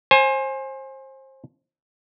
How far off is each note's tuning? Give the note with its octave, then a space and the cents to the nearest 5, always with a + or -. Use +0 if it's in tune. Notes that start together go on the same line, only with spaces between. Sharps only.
C5 +30 G#5 +0